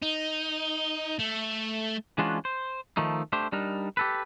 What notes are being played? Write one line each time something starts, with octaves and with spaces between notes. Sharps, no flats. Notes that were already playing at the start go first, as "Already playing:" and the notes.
D#4
A3
E3 G#3 C#4 D4 F4 F#4
C5
D#3 F3 A3 D#4
A3 D4 G4 C5
G3 D4 D#4 A#4
G4 A4 B4